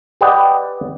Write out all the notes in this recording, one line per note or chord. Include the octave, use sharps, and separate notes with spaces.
G4 B4 D5 D#5 F#5 G5